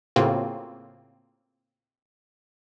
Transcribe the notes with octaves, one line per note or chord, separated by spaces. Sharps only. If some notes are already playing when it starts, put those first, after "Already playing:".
A2 C#3 A#3 C4 F4 F#4